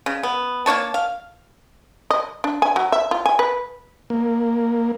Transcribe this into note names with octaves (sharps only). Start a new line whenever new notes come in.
C#3
B3
A#3 D#4 C#5 A5
F5
D#5
D4
G#5
F#3
E5
F4
G#5
B4
A#3